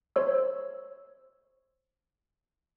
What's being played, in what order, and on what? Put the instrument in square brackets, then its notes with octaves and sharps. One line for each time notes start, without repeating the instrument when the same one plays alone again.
[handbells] C5 C#5 E6